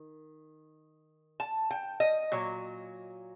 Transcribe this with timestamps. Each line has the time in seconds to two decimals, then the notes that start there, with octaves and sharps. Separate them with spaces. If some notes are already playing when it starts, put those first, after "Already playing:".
Already playing: D#3
1.40 A5
1.71 G5
2.00 D#5
2.32 A#2 F#3